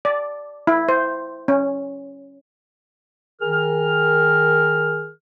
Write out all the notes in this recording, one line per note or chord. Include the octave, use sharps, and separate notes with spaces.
D5
E4
C5
C#4
D#3 G#4 A#4 F6